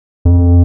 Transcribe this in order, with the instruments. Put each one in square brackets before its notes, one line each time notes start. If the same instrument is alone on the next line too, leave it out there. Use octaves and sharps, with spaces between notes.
[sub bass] F2